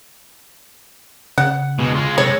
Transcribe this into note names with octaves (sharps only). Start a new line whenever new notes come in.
C#3 F#5
B2 G#3
G#3 F4
C3 G#3 A4 C#5